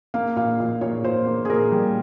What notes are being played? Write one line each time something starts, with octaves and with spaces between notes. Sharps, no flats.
A#3 F5
A#2 F5
A#2
A#2 C#5
A#2 C5
A#3
G#4
A#2 A#4
G3